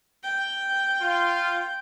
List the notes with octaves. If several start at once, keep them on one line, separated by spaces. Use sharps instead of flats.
G5
F4